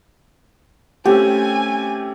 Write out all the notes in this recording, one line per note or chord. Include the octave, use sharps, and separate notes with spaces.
A3 C4 C#4 G4 G#5